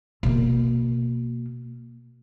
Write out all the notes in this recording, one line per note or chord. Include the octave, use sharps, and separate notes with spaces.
B2 A#3